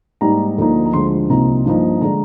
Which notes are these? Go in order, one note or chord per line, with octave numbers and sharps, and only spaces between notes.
G#2 G3 A#3 D#4 A#5
D2 D3 F3 A#3 D#4
A#5
D2 D3 F3 G#3 C6
C2 C3 F3 A#3 D#4 A#5
G2 F3 A#3 D#4
D3 G#3 D4 A#5